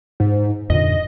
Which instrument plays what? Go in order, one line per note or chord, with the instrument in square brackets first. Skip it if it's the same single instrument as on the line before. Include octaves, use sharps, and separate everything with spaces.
[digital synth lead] G#2
[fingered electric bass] F2 A#2 D3 [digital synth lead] D#5